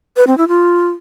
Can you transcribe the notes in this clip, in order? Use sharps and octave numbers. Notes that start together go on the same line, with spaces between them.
B4
C4
E4
F4